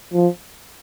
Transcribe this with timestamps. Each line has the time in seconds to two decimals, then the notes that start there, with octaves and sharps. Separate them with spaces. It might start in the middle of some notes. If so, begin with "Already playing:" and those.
0.14 F3